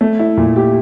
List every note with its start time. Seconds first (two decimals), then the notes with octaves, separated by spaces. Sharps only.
0.01 A3
0.19 E4
0.37 A#2
0.56 G4